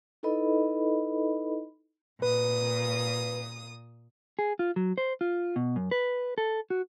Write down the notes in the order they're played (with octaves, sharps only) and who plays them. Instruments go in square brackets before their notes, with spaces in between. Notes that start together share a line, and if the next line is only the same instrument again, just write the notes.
[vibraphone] D#4 E4 A4 B4 D#5 B5
[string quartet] A#2 D#6 [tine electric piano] B4
[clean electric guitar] G#4
F4
F#3
C5
F4
B2
F#2
B4
A4
F#4